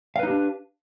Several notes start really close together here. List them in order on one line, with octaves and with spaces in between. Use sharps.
F5 B4 D#4 G4 D4